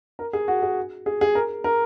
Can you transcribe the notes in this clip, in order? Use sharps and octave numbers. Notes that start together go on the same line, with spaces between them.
A#4
G#4
F#4
G#4
G#4
G#4
A#4
A#4